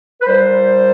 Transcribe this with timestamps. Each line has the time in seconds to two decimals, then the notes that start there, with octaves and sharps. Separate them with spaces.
0.21 B4
0.26 A#2 G3 C5